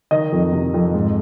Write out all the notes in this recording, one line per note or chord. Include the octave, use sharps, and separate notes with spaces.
D#3 D#5
F2
C3
F2
G#2